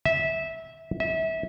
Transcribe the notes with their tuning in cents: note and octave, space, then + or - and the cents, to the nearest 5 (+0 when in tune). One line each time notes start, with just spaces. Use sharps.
E5 -15
E5 -25